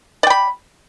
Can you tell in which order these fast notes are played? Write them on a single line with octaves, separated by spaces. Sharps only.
D5 G5 B5